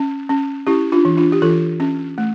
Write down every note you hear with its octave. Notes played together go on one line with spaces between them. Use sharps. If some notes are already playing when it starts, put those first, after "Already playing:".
Already playing: C#4
C#4
C#4 E4 G4
D4 F4
E3
D4 F4
G4
E3 F4 A4
C#4
A3